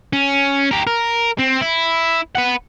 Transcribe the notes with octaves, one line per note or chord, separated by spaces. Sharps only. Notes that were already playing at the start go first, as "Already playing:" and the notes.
C#4
G4 A#4
A#4
C4
E4
B4 F#5